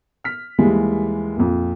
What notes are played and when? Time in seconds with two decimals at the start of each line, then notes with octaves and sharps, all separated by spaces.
0.24 F6 B6
0.58 D#2 E3 G3 G#3
1.37 A#1 F2